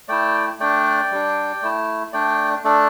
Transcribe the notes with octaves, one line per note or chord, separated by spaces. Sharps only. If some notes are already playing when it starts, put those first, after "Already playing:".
A3 E4 D5 G5
A3 D4 D5 G5
G3 D4
A3 E4
A3 D4 D5 G5
A3 D4 A4 D5